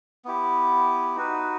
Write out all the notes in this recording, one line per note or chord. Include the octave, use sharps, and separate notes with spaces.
B3 E4 G4
D#4 F#4 B4